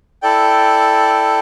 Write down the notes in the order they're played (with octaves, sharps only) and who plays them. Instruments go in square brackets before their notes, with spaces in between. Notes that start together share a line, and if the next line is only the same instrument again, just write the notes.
[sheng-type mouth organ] E4 A4 D5 G5